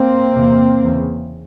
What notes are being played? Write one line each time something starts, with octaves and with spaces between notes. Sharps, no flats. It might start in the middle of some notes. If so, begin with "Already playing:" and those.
Already playing: A#3 C4
E2 C3
E2 C#3